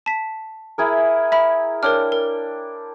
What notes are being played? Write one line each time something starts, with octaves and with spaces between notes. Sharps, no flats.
A5 B6
E4 G#4 A#4
E5 B5
D4 A#4 C#5 G5 F6
A#4